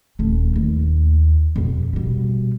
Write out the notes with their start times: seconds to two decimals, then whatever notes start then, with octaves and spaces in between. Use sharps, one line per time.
0.19 D#1 A3
0.56 D#2
1.56 F2 B2
1.93 B2 G3